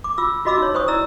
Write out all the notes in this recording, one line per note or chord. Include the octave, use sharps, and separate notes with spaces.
D6
F4 D6 E6
F4 F#4 D#5 B5 D6 E6
D#4 C#5
C5 C#5 G5 C#6 D#6
E4 D5 A#5 E6